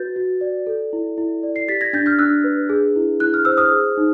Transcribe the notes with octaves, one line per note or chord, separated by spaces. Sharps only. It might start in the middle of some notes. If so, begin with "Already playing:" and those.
Already playing: F#4 B4 G6 A6
F#4
D5
A4
E4
E4
D5
C7
G4 A6 B6
G#6 A#6
D4 G6 A6
F6 G6
D4 E6 F#6
B4
G#4
E4
E4 F#6
F6
C5 E6
D#6 F6
G#4
D#4